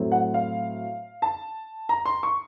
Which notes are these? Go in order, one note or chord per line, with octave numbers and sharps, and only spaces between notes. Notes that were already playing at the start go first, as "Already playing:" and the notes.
Already playing: A2 F#3 A3 C4
F#5
F5
A5
A#5
C6
C#6